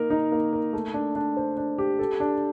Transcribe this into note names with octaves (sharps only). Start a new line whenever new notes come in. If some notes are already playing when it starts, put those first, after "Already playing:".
Already playing: A#3 D#4 A#4
D#4
A#3
A#4
A3
D4
D4
C5
D4
G4
A4
D4